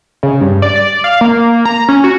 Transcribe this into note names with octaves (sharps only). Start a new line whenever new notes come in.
C#3
G2
D5
D5
F5
A#3
A#5
C#4
F#4